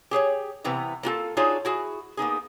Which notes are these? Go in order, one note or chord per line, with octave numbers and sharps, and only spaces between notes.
G4 G#4 C5 C#5
C3 E3 B3 A#5
A#3 F4 F#4 A4
D4 D#4 F4 F#4 G#4 C#5
E4 F#4 G#4
A#3 B3 D#4 G#4